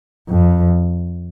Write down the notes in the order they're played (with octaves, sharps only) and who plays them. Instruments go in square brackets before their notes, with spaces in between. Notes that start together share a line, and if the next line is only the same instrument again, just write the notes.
[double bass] F2